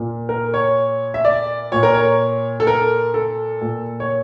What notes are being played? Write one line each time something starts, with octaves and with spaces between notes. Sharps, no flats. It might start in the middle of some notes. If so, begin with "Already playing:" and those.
Already playing: A#2
A#4
C#5
E5
D5
A#2 C#5
A#4
C#5
A4
A#4
A4
A#2
C#5